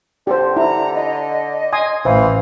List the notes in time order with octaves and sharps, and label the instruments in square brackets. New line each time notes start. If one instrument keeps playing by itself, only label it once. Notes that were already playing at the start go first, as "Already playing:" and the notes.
[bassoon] D3 [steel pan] G4 C5
[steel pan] E4 [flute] A#5
[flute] D#5
[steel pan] G#5 C6 D#6
[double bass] A1 [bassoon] E3 [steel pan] C5 [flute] F5